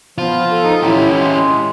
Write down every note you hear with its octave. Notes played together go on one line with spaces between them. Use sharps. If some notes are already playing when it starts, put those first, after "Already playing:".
F3 B3 F4
A4
D#4
D3 C#4 E4 G4
G#3 C6